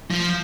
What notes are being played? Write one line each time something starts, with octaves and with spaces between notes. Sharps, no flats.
F3